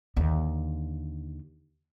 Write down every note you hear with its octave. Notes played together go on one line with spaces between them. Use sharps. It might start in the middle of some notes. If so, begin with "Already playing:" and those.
D#2 D3